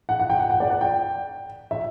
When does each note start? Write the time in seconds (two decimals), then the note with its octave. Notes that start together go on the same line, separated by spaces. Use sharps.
0.09 F#5
0.19 F#5
0.30 G5
0.39 F#5
0.50 F#5
0.60 D5
0.70 F#5
0.81 G5
1.71 E5